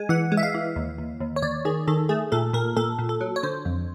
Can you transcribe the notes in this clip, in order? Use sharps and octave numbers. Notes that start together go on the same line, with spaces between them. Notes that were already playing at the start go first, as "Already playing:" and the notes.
Already playing: G#3 G#5
E3 F#5
G#3
E5
F5
E3
D#2
D#2
D#2
C#5
D#2 D5
D#3 G#4
D#3 A4
A3 G#4
A#2 A4
A#2 A#4
A#2 A4
A#2
A4
F#3
C#5
D3 C5
F2